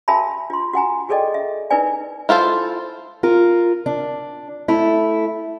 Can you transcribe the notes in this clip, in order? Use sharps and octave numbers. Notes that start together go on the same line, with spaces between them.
F#4 A#4 E5 G#5 A5 B5
F4 C6
F#4 F#5 G#5 A#5
F#4 G#4 A4 D5 D#5 G5
E5
D#4 E4 A#4 B4 D5 G#5
E4 F4 A4 C5
F4 A#4
D4
A3 E4